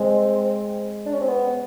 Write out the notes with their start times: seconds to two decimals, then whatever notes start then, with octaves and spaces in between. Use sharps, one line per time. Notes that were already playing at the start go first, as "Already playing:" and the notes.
Already playing: G#3 C4
1.06 D4
1.13 C#4
1.21 C4
1.28 B3